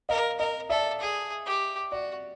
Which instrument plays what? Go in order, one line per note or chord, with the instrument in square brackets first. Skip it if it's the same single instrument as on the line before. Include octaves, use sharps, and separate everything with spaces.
[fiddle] A#4 [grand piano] D#5 F5
[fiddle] A#4 [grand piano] D#5
[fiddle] A4 [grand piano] D5 E5
[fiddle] G#4
G4
[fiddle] F#4 [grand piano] D5